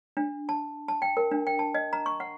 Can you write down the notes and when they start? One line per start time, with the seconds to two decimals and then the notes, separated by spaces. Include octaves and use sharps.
0.17 D4
0.49 A5
0.88 A5
1.02 G5
1.17 A#4
1.31 D4
1.47 G5
1.59 A5
1.75 D#5
1.93 A#5
2.06 C#6
2.20 F#5